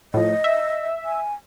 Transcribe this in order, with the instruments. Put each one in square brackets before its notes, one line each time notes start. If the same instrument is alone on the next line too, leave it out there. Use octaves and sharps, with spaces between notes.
[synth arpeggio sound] A2 F3 [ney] D#5
[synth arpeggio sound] E5
[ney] G#5